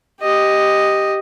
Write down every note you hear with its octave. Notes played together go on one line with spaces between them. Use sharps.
G4 D#5